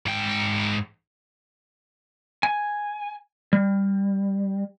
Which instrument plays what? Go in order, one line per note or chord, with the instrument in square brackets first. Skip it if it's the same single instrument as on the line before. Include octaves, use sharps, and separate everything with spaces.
[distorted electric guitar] G#2 G5
[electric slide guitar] G#5
G3